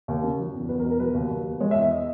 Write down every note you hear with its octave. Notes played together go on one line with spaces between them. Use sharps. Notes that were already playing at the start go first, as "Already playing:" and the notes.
D#2
C#3
F#3
E2
E2 B4
A#4
B2
A#4
F#3 B4
D#2
D#2
D#3
G#3 C#5
E5
E2
E5
D#5